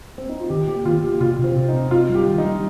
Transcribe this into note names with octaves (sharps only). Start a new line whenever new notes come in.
C4
D#4
F4
D#3 G4
A#3 G4
D#3 F4
A#3 G4
C3 F4
C3
C4
C3
C4 D#4
C4 F4
G3
G4
D#3
D#4
G3